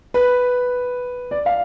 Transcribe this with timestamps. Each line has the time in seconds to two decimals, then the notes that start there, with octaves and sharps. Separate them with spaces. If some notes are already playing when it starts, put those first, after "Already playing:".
0.14 B4
1.31 D5
1.46 F5